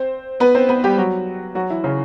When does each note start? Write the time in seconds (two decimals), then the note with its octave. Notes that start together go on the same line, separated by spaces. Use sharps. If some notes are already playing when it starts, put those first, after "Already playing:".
Already playing: C4 C5
0.40 B3 B4
0.55 C4 C5
0.69 B3 B4
0.84 G3 G4
0.98 F#3 F#4
1.55 F#3 F#4
1.70 E3 E4
1.84 C#3 C#4